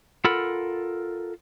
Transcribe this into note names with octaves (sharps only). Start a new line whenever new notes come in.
F4 A4 A#4 F#5 B5